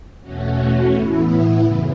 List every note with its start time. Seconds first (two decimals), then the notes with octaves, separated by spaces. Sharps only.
0.21 E2 B2 A3 C#4 F#4
0.91 A2 E3 B3 E4
1.62 F#2 C#3 E3